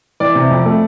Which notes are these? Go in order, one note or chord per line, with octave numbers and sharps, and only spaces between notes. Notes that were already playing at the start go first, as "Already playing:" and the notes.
E3 D5
C3
F2
A3